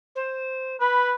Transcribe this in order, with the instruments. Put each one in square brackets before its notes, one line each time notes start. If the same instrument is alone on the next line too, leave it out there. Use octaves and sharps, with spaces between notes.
[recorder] C5
[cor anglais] B4 [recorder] B5